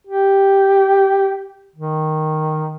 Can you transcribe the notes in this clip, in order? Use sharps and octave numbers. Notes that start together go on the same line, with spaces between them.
G4
D#3